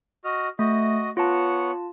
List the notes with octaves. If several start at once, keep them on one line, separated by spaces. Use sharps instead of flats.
F#4 D#5 F6
A3 F#4 D#5
B3 F4 C#5 F#5 A5